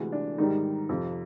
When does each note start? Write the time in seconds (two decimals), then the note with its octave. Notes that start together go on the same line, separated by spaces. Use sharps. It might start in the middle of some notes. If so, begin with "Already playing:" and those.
Already playing: D2 C3 E3 G#3
0.12 D4
0.38 G#2 D#3 G3 D#4
0.89 F2 C3 F3